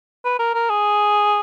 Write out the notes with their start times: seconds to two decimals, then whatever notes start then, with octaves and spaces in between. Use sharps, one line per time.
0.25 B4
0.39 A#4
0.55 A#4
0.70 G#4